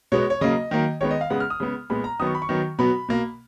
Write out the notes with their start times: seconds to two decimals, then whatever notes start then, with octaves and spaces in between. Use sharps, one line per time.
0.12 B2 G#3 B3 C#5
0.30 C#5
0.41 C#3 F#3 A#3 D#5
0.71 D#3 F#3 A#3
1.01 D#3 G#3 B3 C#5
1.11 D#5
1.21 F5
1.30 C#3 G#3 B3 F#5
1.40 F6
1.50 D#6
1.60 C#3 G#3 B3
1.90 A#2 G#3 B3 B5
2.04 A#5
2.20 D#3 F#3 B3 D#6
2.27 C#6
2.35 B5
2.42 C#6
2.49 D#3 F#3 B3
2.79 B2 F#3 B3 B5
3.09 B2 A#3